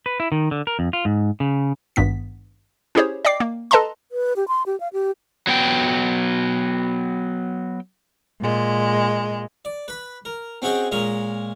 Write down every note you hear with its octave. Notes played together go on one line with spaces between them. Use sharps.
B4
E4
D#3
D3
A#4
F2
F4
G#2
C#3
G#1 G2 B3 B6
C#4 E4 G4 G#4 C5 C#5
D5 D#5 G5 D6 C7
A#3
A4 B4 D#5 A5 A#5 C6
B4
G4
C6
G4
F5
G4
F#3 B3 G5
A#2 G#3
D5
B4 B5
A#4
C4 C#4 F#4 G#4 D#5 G5
A#2 G#3 C#4 A#4 A#5